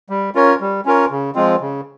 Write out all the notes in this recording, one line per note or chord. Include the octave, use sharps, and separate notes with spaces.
G3
C#4 F4 A#4 C#5
G3
C#4 F4 A#4 C#5
C#3
F3 G#3 C4 F4
C#3